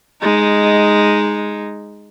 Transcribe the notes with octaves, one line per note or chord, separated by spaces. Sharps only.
G#3 D#4